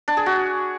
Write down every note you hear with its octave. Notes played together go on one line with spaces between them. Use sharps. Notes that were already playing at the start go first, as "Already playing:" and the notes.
D4
G#4
F#4